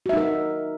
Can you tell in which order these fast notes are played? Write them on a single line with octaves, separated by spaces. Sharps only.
F#4 E5 D#4 A#4